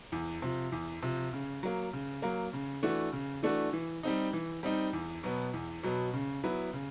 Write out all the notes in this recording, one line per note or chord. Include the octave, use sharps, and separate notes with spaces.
E2
C3 F3
E2
C3 F3
C#3
F#3 A#3
C#3
F#3 A#3
C#3
E3 A3 D4 F#4
C#3
E3 A3 D4 F#4
E3
G3 C4 D#4
E3
G3 C4 D#4
E2
B2 F#3 B3
E2
B2 F#3 B3
C#3
F#3 B3 E4
C#3